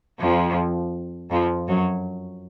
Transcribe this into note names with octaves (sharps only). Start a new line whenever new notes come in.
F2 F3
F2 F3
F#2 F#3